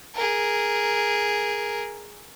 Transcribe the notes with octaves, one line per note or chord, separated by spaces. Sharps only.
G#4 A#4